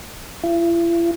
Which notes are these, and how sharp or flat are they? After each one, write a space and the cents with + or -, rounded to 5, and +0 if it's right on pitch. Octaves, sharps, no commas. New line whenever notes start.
E4 +45